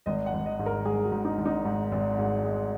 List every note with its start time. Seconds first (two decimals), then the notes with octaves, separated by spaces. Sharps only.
0.06 G#1 D#5
0.26 F#5
0.33 G#1
0.46 D#5
0.59 G#2
0.66 A#4
0.85 G#2 G#4
1.05 F#4
1.12 G#2
1.25 D#4
1.38 G#1
1.46 D#4
1.65 G#2
1.92 G#1
2.18 G#2
2.44 G#3